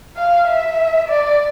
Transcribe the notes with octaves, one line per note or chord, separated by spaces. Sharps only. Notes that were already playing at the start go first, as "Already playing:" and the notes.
F5
E5
D5